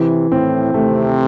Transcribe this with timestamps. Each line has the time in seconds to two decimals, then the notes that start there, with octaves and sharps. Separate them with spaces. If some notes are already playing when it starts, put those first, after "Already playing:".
Already playing: C3 E3
0.31 A2 C4
0.74 C3 A3